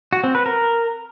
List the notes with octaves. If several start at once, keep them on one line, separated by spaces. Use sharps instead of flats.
F#4
C4
B4
A#4